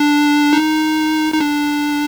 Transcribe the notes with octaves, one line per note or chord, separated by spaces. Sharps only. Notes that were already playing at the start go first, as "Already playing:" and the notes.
Already playing: D4
D#4
D#4
D4